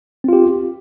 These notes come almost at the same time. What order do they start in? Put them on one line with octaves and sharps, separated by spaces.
C4 F4 G4